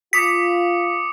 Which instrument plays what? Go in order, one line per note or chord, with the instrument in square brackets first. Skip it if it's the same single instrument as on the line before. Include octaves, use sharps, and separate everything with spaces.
[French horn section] F4 [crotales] D6 D#6 C#7 [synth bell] B6